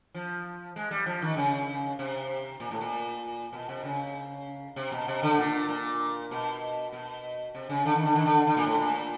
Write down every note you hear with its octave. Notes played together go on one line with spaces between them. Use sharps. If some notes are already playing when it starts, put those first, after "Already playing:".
F3
G#3
G3
F3
D#3
C#3
C3
A#2
A2
A#2
B2
C3
C#3
C3
B2
C3
D3
A#2
A#2
B2
B2
C3
C#3
D3
D#3
D3
D#3
D3
D3
A#2
A2
A#2